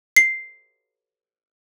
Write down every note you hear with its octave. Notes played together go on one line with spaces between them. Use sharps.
C7